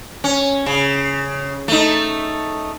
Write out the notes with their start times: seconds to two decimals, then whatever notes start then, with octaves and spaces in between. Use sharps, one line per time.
0.24 C#4
0.66 C#3
1.68 A3 D#4